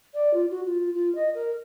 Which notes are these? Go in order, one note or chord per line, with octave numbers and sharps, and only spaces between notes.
D5
F4
F#4
F4
F4
D#5
A#4